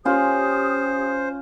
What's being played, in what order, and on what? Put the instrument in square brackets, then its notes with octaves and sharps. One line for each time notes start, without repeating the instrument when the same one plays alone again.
[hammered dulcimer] C#4 F4 [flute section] G4 D#6 [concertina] C5